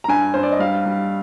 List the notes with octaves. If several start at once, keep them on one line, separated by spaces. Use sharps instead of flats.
A#5
G2 G#5
G2 C5
D5
D#5
G3 F5
G3